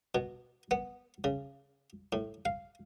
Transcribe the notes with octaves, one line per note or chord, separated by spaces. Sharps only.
B2
B3
C#3
A2
F5